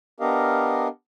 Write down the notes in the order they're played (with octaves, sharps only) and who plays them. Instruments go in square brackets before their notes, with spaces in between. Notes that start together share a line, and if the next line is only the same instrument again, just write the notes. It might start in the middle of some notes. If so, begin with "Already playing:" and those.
[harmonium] B3 D4 G4 A#4 D#5 F5